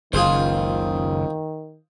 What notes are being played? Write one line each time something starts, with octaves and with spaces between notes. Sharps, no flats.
F#1 C#2 D#3 F4 G#4 C5